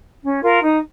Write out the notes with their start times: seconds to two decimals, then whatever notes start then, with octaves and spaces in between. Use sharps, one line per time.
0.23 C#4
0.43 F4 A#4
0.62 D#4